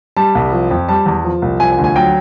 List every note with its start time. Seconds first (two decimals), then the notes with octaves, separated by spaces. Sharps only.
0.17 G3 A5
0.35 C2
0.53 F3
0.71 F2
0.89 G3 A5
1.06 E2
1.24 F3
1.42 C2
1.60 F3 G#5
1.72 G#5
1.78 D2
1.84 G#5
1.96 F#3 G5